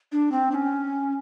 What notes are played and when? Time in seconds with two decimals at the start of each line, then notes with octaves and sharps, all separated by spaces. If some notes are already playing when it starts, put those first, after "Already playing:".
0.12 D4
0.32 C4
0.51 D4
0.55 C#4